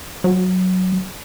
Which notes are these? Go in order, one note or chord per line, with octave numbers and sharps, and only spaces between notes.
F#3